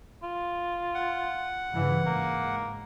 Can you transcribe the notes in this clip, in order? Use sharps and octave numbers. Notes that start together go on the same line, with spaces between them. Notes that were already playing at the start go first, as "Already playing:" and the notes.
F4
F#5
G2 C#3 E3
G#2 A#3